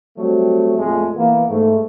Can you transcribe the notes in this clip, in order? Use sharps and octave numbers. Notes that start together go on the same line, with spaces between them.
F#3 G3 A3 C4
F2 A#2 G#3 A3
E3 A#3 B3
G#2 A3